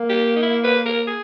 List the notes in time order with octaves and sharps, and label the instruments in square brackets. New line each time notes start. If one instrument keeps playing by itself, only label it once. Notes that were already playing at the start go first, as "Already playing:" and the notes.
Already playing: [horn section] A#3
[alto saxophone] G4
D#4
E4
B4
A#4
G#4